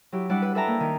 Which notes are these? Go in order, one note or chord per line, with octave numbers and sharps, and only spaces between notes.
F#3 E4 G4
G3 D4 E4 D5 F#5
B4 F#5
A4 B4 E5 G5 A5 A#5
A#3
D#3